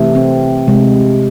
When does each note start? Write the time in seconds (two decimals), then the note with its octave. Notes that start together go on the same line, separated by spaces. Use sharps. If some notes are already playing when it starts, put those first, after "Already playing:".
Already playing: C3 E3 A3
0.15 C4
0.68 C3 G#3